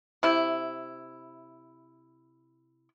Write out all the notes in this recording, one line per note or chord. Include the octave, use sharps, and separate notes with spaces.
C3 E4